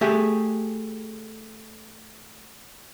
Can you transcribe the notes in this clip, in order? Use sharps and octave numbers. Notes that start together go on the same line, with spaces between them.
A3 G4 G#4 E5